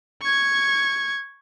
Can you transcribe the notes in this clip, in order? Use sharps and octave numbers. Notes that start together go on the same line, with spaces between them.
C#6 G#6